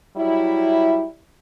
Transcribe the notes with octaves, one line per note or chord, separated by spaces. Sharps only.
F#3 G3 E4